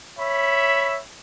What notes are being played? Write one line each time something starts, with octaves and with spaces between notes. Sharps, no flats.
C#5 E5 B5